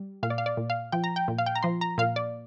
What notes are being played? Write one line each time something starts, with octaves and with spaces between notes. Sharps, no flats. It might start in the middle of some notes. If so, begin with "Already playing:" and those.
Already playing: G3
A#2 F5
D5
F5
D5
A#2
F5
F3 G5
A#5
G5
A#2
F5
G5
A#5
F3 C6
A#5
A#2 F5
D5